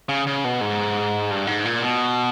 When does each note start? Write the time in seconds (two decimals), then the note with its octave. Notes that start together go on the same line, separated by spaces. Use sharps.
0.09 C#3
0.27 C#3
0.44 B2
0.61 G#2
1.31 G2
1.47 G#2
1.65 A#2
1.83 B2